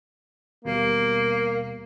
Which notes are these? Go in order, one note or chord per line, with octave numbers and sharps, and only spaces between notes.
D#2 B2 G3 A#3